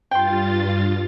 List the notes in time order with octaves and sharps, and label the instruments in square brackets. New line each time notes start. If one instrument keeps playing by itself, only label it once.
[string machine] G2 F4 A6 [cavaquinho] G5 C6